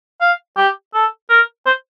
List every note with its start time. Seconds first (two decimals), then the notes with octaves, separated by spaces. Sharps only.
0.21 F5
0.57 G4
0.94 A4
1.30 A#4
1.66 C5